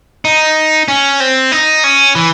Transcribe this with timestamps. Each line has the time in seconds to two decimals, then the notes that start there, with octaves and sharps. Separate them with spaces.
0.25 D#4
0.88 C#4
1.20 C4
1.52 D#4
1.84 C#4
2.15 E3